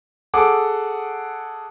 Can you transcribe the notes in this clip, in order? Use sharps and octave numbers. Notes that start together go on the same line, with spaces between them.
G#4 A4 F#5 D6